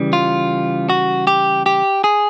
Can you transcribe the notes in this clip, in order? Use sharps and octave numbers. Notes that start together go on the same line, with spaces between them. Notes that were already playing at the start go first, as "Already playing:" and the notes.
Already playing: C#3 E3 G3
F4
F#4
G4
G4
G#4